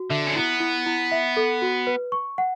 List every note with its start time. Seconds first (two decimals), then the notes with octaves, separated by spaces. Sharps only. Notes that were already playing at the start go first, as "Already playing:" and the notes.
Already playing: F#4
0.10 D3 E5
0.26 C#4
0.35 B3 E4
0.60 E4
0.86 E4
1.11 E5
1.36 A4
1.62 F#4
1.87 B4
2.12 C#6
2.38 F#5